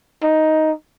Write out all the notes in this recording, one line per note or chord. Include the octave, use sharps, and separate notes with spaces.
D#4